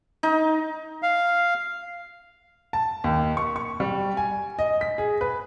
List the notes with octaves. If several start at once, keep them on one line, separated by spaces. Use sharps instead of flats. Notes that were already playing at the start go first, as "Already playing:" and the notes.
D#4
F5
A5
D#2
C#6
C#6
G3
G#5
D#5
B6
G#4
B4